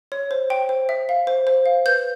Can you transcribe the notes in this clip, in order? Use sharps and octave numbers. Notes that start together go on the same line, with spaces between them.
C#5
C5
G5
C5
E5
F5
C5
C5
F5
B4 G6